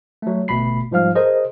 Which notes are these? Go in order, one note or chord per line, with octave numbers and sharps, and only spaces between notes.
F#3 A3
G1 B2 A3 B5 C7
G#2 F3 G3 F5 F6
G#4 A#4 C5 D#5